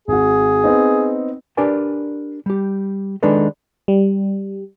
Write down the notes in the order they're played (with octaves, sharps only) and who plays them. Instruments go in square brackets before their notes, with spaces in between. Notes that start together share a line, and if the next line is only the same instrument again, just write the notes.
[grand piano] G#1 F#4 [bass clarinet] G#4
[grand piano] B3 C4 D#4
[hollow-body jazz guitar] D4 G4 A#4 B4 D5 G#5
G3 G4
D#3 G#3 D4 D#4 A4 B4
[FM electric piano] G3